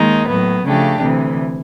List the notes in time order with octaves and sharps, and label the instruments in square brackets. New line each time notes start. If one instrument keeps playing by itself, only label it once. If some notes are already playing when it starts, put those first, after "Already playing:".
Already playing: [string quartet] D#2 D#3 G#3 D#4
A2 F#3 B3
C#3 F3 A3 D4 G4
D2 C3 E3